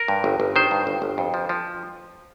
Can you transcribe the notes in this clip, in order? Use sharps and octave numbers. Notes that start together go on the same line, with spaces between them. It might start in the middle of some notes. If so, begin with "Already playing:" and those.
Already playing: A#4
G2
G1
G1
D#3 C5
G2
G1
G1
F2
F3
F3